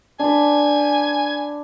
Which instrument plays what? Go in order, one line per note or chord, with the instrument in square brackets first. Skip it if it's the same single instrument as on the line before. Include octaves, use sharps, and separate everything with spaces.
[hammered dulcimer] D4 B4 [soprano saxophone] G#5